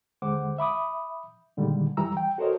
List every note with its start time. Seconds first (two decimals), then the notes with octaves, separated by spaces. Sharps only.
0.22 D#2 D3 G#3 C5 F#5 D6
0.58 E5 B5 D6 D#6
1.57 A#2 D3 D#3 G3 G#3
1.97 F2 E3 G3 A#5 E6
2.17 G5
2.38 F#4 A4 A#4 C5 C#5 D#5